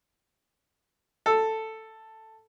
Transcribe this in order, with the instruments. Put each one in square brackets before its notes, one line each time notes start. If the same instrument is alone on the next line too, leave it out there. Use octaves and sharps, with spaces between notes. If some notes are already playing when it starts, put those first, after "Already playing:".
[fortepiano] A4